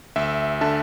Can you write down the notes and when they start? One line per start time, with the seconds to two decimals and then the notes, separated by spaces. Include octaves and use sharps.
0.16 D2 E5
0.61 D3 E5 A5